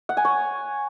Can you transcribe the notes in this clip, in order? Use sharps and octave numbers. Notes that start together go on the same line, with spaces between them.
F#5
G#5
C#5